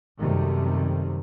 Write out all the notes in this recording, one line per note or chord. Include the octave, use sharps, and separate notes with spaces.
F#2 C3 D#3 G3 A3